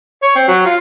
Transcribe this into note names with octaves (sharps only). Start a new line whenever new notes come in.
C#5
C4
F#3
F4